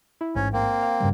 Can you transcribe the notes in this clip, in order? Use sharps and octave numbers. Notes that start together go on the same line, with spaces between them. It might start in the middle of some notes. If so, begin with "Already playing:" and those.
E4
A1 G#2 C#4
A#3 C4
F5
G2 C#3 G3